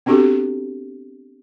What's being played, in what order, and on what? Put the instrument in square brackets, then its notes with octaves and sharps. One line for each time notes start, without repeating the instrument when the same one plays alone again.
[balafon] B3 C4 D4 F#4 G4 A4